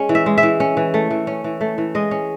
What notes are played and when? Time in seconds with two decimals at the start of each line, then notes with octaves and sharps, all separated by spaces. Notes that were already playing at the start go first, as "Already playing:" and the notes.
Already playing: G#3 C#4
0.09 E3
0.15 E5
0.26 G#3
0.38 E5
0.43 E3
0.60 C#4
0.77 E3
0.94 A3
1.11 E3
1.27 C#4
1.44 E3
1.61 A3
1.78 E3
1.95 G#3 D#5
2.11 C#4